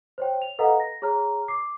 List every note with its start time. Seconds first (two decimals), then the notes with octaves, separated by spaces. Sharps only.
0.18 C5 C#5 G5
0.42 F7
0.59 A4 B4 D#5 F5 F#5 A#5
0.80 A#6
1.02 G#4 C#5 A#5 F6
1.48 D6 C7